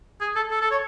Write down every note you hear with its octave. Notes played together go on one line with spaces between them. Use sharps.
G#4
A4
A4
A4
C#5